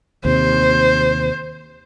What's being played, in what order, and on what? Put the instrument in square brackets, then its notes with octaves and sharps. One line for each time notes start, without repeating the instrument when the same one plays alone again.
[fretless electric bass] D#2 C3 [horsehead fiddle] C5